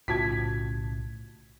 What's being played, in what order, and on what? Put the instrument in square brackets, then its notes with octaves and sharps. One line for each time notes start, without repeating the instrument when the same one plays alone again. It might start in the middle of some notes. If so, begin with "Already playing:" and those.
[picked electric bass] B1 A2 C#3 [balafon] F4 F#4 A5 [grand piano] G#6 B6